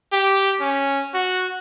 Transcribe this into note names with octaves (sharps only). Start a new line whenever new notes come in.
G4
C#4
F#4